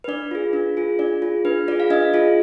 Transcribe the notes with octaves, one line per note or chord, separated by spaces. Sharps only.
B4
D4 D5
F4 G#4
D4
F4 G#4
D4 D5
F4 G#4
D4 B4
F4 G#4 D5
F5
D4 D#5
F4 G#4